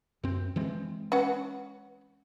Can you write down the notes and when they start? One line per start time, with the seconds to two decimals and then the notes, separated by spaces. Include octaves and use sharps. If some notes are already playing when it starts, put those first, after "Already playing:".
0.23 F#2 C4
0.56 E3 G#3 C4
1.12 C#4 B4 F#5